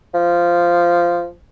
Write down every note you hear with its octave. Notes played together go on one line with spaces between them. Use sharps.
F3